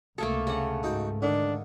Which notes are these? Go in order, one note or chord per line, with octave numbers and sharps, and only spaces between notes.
C#2 C3 A3 A#3 G#4 A4
C#3 D4 F#5
G#2 D#4 F#4 G5
D3 D#3 D4